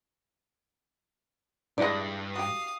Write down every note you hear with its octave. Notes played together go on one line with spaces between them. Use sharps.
G2 G#3 D4 E4 D5 D#5
F#4 G4 F5 D#6